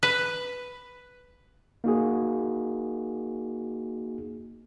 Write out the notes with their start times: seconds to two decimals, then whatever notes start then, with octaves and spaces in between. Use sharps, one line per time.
0.03 B4
1.84 A#3 D#4 F#4 G#4